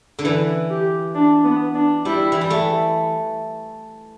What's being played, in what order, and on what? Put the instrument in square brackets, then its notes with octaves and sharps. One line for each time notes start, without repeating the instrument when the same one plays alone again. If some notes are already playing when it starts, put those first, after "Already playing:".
[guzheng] D3
[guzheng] E3 [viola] B4
[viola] G4
D4
B3
D4
[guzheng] G3 [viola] E4
[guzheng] E3
G3
A3